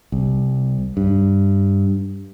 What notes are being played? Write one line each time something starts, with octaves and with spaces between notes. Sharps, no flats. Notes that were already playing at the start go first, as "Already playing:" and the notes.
C2
G2